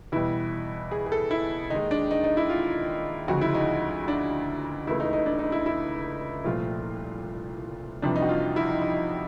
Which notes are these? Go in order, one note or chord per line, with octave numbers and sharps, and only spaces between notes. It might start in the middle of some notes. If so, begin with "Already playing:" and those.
E2 B2 G3 E4
G#4
G#4
A4
E4
D#2 D#3 G#3 D#4
D4
D#4
D#4
E4
F4
D2 C#3 F3 G#3 F#4
E4
D#4
D4
C#2 C#3 E3 A3 E4
D#4
D#4
D4
D#4
E4
E4
C2 A#2 F3 A3 F4
F2 C3 E3 G3 D4
D#4
F#4
F4
E4
D#4
D#4